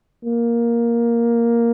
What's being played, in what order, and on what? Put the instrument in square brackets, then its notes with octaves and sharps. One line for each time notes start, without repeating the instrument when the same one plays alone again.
[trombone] A#3